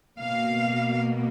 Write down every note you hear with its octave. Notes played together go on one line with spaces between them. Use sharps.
B2 A#3 F5